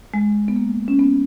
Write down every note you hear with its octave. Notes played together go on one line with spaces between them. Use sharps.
G#3
B3
A#3
C#4
B3